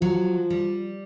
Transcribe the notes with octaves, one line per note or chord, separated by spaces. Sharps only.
F3 F#3
G3